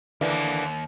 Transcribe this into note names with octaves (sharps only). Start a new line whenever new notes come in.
D#2 D3 E3 A#3